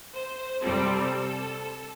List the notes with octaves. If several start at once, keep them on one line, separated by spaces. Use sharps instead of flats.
C5
C3 G3 C4 A4